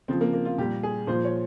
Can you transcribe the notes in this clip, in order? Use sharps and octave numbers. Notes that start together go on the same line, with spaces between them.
C#3 F3 C4
A#3
A#3
F4
A#2 G3 G4
G#4
A#2 F3 C5
C#5